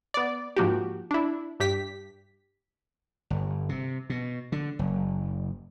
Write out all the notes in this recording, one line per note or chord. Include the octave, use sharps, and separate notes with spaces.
B3 D5
G#2 F3 A#3 F#4 G4
D4 E4
G2 G4 B6
G1
C3
B2
D3
F#1